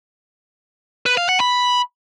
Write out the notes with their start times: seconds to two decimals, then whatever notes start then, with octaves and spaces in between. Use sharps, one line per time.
1.06 B4
1.17 F5
1.29 F#5
1.40 B5